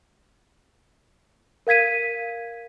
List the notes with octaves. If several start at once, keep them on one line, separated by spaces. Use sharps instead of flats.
A#4 F5 G#6 B6 D#7